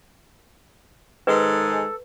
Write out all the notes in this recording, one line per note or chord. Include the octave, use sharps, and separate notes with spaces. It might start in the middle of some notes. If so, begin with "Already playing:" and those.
G#2 D#3 G#3 A4 B4